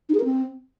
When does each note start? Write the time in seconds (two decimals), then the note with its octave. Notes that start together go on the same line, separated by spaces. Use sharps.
0.09 D#4
0.14 G#4
0.19 A#4
0.25 C4